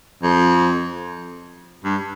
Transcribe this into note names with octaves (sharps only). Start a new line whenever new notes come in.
F2
G2